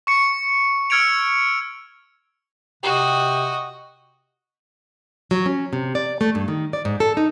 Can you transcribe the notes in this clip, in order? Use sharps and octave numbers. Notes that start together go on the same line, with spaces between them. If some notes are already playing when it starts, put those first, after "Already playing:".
C#6 C#7
E6 F6 G#6 C#7 D7 F7
C3 F#4 G4 D#5
F#3
C#4
C3
D5
A3
G2
D#3
D5
G#2
A4
D#4